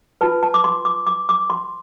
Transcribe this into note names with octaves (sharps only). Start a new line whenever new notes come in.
F4 B4 A5
A5
D6
C6
D6
D6
D6
C6